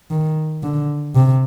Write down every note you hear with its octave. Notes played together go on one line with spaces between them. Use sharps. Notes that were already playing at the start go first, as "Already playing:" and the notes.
D#3
D3
C3